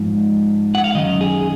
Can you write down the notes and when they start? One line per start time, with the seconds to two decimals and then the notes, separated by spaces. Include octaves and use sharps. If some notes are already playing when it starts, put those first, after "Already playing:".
Already playing: G#2 F3
0.75 F#5
0.84 F5
0.95 F#2 D#3 F#3 D#5
1.21 G#4